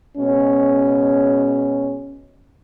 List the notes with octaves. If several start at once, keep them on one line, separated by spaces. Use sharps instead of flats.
B2 G#3 C#4